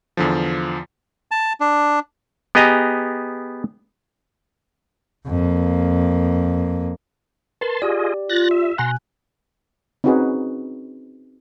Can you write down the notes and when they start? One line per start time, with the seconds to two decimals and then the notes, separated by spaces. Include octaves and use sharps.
0.17 E2 D3 F3
1.31 A5
1.60 D4
2.55 B3 G4 G#4 D#5 G#5 A#5
5.27 F2 A#3
7.61 A#4 B4 A5 C6
7.82 F4 G4 G#4 D5 D#5
8.29 F4 F#6 A6 A#6
8.51 E5
8.78 B2 F#5 G#5 A#5 C6 F#6
10.04 C4 C#4 D#4 F#4 G#4 B4